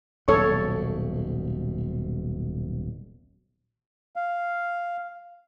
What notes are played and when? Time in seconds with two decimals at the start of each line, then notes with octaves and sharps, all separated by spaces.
0.28 D#1 B1 G#2 A4 C#5 C#6
4.16 F5